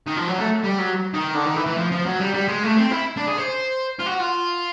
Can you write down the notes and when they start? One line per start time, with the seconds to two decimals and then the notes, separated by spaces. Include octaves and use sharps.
0.07 D#3
0.17 F3
0.28 F#3
0.38 A3
0.63 G3
0.78 F#3
1.13 D#3
1.34 D3
1.46 D#3
1.56 E3
1.66 E3
1.78 F3
1.92 F3
2.06 F#3
2.20 G3
2.34 G3
2.48 G#3
2.63 A3
2.77 C4
2.91 E4
3.17 D4
3.27 G#4
3.37 C5
3.99 F4
4.06 F#4
4.20 F4